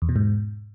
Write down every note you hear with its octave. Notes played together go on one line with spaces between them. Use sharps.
E2
B2
G#2